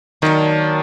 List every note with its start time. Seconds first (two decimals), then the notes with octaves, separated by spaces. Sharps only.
0.22 D#3 F#3 A#3 D4